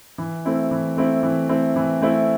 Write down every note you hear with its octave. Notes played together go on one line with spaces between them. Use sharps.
E3
A3 C4 E4
E3
A3 C4 E4
E3
A3 C4 E4
E3
A3 C4 E4